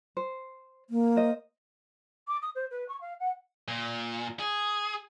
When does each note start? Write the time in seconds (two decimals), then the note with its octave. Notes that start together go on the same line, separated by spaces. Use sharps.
0.17 C5
0.90 A#3
1.16 C5 D#5
2.28 D6
2.42 D#6
2.55 C5
2.71 B4
2.88 C#6
3.01 F5
3.20 F#5
3.68 A#2
4.39 G#4